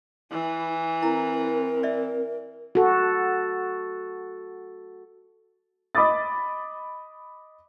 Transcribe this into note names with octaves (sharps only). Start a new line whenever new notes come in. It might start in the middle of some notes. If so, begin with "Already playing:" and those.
E3 E4
C4 E4 A#4 A#5
D5 E5
F#4 A4
D#5 B5 D6 D#6 A6